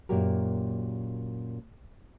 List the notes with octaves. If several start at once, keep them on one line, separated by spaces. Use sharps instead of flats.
F#2 A#2 A#3 F#4 G4 A#4